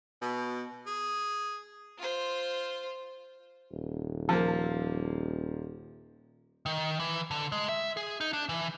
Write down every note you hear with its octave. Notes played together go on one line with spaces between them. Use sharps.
B2
G#4
F4 C5
D#1
F3 A#3
D#3
E3
D3
G#3
E5
G#4
D#4
D4
E3